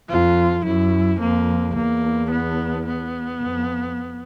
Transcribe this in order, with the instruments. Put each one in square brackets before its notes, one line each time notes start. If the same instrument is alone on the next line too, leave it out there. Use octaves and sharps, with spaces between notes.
[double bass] F2 [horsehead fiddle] F4
[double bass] F#2 [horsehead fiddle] E4
[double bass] F2 [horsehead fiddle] A#3
[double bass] E2 [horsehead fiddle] A#3
[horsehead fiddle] B3
B3
[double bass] F2